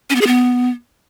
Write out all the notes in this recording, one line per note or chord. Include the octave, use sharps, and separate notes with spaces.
C#4
B3
G#4
B3